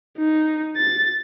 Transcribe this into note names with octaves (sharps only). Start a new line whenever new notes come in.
D#4
A6